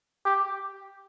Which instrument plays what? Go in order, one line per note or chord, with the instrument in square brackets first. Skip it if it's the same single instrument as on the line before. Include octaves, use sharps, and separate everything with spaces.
[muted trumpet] G4